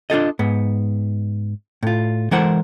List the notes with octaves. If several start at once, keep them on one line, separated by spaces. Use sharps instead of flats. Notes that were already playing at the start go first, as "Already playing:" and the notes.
D4 F4 A4 D#5
G#2 B3
A2 F4
E3 G#3 A4 A#4 C5 F#5